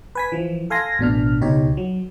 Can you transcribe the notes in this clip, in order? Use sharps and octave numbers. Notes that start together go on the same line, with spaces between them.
B4 G#5 B6
E3 F3
A4 F5 G#5 C6 A#6
A1 B2 D4 F6
C#2 B2 D#4 G4 C#5
F#3